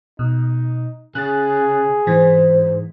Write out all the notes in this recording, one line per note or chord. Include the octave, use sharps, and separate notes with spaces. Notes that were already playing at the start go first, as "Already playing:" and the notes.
B2 D#4
C#3 G#4 F#6 A6
G#2 E3 C5